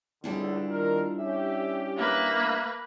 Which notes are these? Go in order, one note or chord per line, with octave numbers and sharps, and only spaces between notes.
C#2 D3 G3 D4 E4
D#3 F4 A#4
C#4 G4 E5
A#3 B4 E5